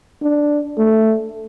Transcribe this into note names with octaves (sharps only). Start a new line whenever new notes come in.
D4
A3